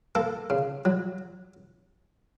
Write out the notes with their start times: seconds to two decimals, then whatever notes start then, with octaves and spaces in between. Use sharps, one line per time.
0.15 A#3 A4
0.50 C#3
0.85 F#3